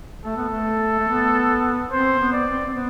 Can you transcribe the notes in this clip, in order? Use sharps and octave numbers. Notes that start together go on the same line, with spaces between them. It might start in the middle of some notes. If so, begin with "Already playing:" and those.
A3 A4
B3
A3
A3
B3
C4 C5
B3
D5
C4
C4
B3